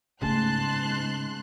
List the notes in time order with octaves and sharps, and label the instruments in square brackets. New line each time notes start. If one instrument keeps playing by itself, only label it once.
[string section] G#2 C6 F#6 [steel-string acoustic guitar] C#3 [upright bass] A3 B3 [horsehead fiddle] A5